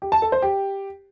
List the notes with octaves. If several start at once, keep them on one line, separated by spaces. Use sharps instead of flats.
G4
A5
A4
C5
G4